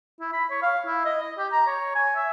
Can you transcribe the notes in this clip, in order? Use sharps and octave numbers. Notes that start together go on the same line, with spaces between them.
E4
B5
C#5
F5
E4
D#5
D#5
G4
A#5
C#5
G#5
E5